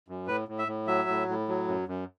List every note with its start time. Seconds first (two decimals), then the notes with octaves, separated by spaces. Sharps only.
0.08 F#2
0.27 A2 B4
0.48 A2
0.59 E5
0.68 A2
0.87 F#3 E5
1.09 A2
1.29 A2
1.48 F#3
1.68 F#2
1.88 F#2